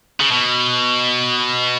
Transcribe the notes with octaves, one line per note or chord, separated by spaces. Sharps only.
C#3
B2